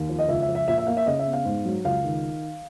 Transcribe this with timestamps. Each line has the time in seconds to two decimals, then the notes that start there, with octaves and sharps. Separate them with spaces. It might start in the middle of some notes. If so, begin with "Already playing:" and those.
Already playing: D#2
0.09 F3
0.19 D#5
0.28 C#2 E5
0.42 E5
0.48 F3
0.55 E5
0.68 A#2 E5
0.78 E5
0.87 A#3 F5
0.97 E5
1.06 C#3 D#5
1.19 E5
1.27 B3
1.33 F5
1.45 G#2
1.65 F#3
1.85 C#2 F5
2.04 D#3